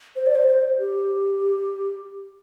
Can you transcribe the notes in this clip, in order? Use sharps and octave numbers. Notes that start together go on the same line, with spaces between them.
C5
D5
C5
C5
G4